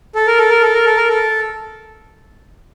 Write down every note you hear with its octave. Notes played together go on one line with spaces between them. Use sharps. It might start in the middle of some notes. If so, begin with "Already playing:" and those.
A4
A#4
A4
A#4
A4
A#4
A4
A#4
A4